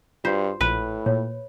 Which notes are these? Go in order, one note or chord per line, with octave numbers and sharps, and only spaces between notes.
G2 F4 F#4 C5
A#1 A2 B4
A#2 C#5